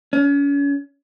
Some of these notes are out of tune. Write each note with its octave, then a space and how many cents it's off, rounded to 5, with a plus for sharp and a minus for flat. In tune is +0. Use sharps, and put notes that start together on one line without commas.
C#4 +35